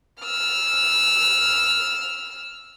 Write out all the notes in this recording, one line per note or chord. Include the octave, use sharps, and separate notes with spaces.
E6 F6